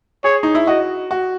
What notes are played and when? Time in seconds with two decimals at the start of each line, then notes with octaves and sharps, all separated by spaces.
0.24 G#4 C#5
0.43 D#4
0.55 E4
0.67 F#4 D#5
1.11 F#4